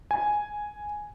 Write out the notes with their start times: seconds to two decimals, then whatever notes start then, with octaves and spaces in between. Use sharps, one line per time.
0.11 G#5